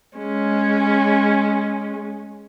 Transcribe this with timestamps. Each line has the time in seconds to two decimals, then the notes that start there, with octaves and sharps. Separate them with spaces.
0.18 G#3 C#4